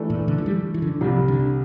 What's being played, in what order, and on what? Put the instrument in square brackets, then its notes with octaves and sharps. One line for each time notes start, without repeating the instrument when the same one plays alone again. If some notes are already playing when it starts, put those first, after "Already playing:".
Already playing: [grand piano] E3 A3 D4 A4
[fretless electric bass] A#2
D3
F3
G3
E3
D3
[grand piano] C2 C3 G3 [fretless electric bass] F3
[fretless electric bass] D3